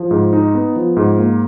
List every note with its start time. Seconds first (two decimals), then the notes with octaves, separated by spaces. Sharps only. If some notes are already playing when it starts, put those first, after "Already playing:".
Already playing: F3
0.11 G#2
0.33 D#4
0.55 B3
0.76 F3
0.97 G#2
1.18 A#3